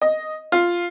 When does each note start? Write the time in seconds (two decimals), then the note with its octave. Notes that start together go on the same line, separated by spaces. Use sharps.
0.02 D#5
0.52 F4